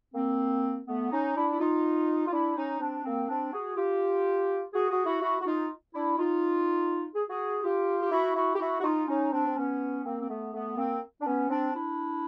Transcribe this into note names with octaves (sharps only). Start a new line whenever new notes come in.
A#3 C4
A3 B3
C#4 D#4
D4 E4
E4
D#4 F4
F4
D4 E4
C#4 D#4
C4 D4
A#3 C4
C4 D4
F#4 G#4
F4 G4
F#4 G#4
F#4 G#4
E4 F#4
E4 F#4
F#4
D#4 F4
D4 E4
D#4 F4
G#4
F#4 G#4
F4 G4
G4
E4 F#4
E4 F#4
G4
E4 F#4
F#4
D#4 F4
C#4 D#4
C4 D4
C4
B3 C#4
A#3 C4
C4
A3 B3
A3 B3
A#3 C4
D4
B3 C#4
C4 D4
D4 E4